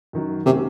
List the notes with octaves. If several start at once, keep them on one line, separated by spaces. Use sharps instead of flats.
F#2 D#3 F#3
C3 D#3 A#3 C#4 F#4